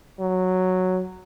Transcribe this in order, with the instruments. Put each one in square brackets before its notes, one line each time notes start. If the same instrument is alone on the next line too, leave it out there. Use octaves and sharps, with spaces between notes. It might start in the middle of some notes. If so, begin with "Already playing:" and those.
[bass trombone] F#3